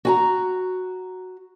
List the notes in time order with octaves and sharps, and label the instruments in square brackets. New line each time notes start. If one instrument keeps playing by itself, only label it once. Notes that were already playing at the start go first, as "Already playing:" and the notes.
[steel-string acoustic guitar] F#4 G#5 A#5